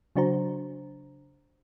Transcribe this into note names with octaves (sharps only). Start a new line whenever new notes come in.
C#3 F#3 D4 F#4 C5 A#5